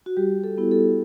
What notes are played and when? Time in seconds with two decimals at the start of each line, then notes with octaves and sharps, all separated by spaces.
0.06 F#4
0.17 G3 G4
0.44 A4
0.58 B3 E4
0.71 A4